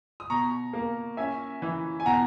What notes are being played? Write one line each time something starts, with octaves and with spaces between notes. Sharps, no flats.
D#6
B2 A#5 C#6
A#3
C#4 E5 G#5
E3
G#5
B2 F#5 A#5